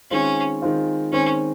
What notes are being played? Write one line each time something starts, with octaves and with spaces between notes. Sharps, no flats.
D#3 G#3 C4 C#4 F4
D#3 G#3 C4 F4
D#3 G#3 C4 C#4